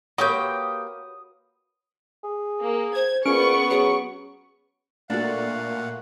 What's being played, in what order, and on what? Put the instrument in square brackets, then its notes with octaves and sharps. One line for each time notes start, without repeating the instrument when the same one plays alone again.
[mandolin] A#3 G4 G5 [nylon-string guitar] F#4 B4 C#5 [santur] D#6
[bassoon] G#4
[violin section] A#3
[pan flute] C5 [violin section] G#6
[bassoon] A#2 [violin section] B3 C#6 [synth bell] C#4 D7 [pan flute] G#4
[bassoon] F#3 [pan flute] G#4
[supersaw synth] A#2 [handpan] A3 A#3 F#4 [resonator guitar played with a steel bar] D4 A4 [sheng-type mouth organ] F5 F#5